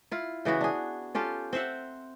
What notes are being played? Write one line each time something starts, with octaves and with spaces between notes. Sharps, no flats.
E4 F4
C#3 E3 B3 F#4
D4 G#4
C#4 F4 G4 A4
C4 C5 E5 F#5